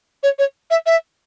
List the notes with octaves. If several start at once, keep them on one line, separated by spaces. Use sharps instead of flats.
C#5
C#5
E5
E5